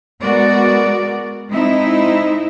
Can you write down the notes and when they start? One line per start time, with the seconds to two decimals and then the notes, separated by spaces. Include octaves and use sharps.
0.21 G#3 B3 F#4 A#4 D5
1.50 G#3 C4 D#4 E4 E5